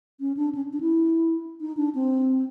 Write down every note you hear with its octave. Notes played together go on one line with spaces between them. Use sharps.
C#4
D4
C#4
D4
E4
D#4
D4
C4